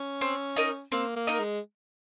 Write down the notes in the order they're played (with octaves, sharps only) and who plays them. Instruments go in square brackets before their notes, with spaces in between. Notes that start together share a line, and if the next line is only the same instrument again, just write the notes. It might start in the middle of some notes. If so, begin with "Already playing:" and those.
Already playing: [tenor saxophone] C#4
[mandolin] C4
D#4 A#4 D#5
[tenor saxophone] A#3 [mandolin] C4
[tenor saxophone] A#3
[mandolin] D#4 A#4 D#5
[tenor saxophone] G#3